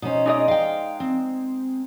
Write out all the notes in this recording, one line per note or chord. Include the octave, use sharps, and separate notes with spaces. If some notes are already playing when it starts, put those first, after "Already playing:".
B2 C#4 D#4 C5
G#3 D#4 D5 D#5
F5 G5
C4